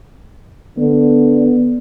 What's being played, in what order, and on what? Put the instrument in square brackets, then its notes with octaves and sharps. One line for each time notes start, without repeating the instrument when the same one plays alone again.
[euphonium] D3 [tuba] B3